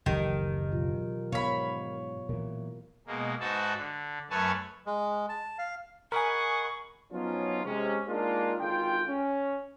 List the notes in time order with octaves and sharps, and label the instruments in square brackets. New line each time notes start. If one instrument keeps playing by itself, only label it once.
[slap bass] F#1 D2 G#2 [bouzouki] D#3 [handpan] E3 G4 A4
[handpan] B2 F#3 F4
[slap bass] G#2 [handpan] B3 F5 [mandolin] C#5 B5
[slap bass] A#2 E3 [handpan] A#4
[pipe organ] B2 G#3 A#3
G#2 D#4 F#4 B4 E5 A5
D3
F#2 A3 B4 C#5 G#5 A5
[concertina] G#3
A5
F5
[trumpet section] G#4 D#5 F#5 [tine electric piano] A#4 [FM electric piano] G#5 B5 [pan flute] C#6
[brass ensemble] F3 F#3 B3 C#4 D#4 F4
C3 G#3 C#4
G#3 A#3 D4 D#4 F4
G#1 D3 F4 G5
C#4